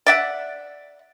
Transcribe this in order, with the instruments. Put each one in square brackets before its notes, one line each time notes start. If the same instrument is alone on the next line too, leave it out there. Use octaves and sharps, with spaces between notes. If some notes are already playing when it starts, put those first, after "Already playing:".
[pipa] D5 E5 F#5